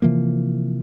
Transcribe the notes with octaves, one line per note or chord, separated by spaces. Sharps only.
C3 E3 F3 A#3